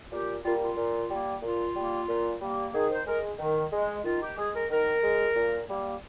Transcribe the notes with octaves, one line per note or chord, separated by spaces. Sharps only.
A#2 G4
G3 A#3 F4
F4
A#2
G3 A#3
A#2 F4
G3 A#3
A#2
G3 A#3
D#3 G#4
C5
G#3 A#4
D#3
G#3
D#3 F4
G4
G#3 G#4
A#4
D#3 A#4
G#3
A#2
G3 A#3